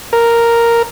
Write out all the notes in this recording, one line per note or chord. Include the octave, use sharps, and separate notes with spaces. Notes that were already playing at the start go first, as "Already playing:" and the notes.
A#4